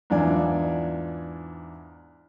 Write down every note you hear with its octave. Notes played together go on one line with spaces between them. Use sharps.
E2 G#2 D4 F4 D5 G#5